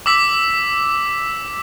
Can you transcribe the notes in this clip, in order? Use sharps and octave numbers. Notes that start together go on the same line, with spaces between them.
D6 E6 B6